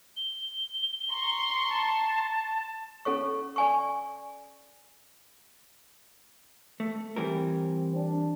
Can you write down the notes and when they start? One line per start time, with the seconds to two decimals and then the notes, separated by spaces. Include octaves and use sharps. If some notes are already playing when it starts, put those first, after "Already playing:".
0.17 G7
1.10 A#5 C6 C#6
1.70 A5
3.05 C#4 A4 C#5 C#6
3.56 D5 G#5 C#6
6.80 A3
7.16 E3 G3 C4 A#4
7.96 D4